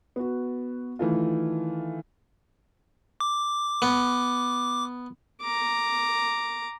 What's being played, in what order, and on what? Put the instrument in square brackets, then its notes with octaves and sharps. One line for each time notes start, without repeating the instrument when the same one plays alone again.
[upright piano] B3 F#4
D#3 E3 A3 F4
[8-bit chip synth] D6
[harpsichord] B3
[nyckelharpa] A#5 D6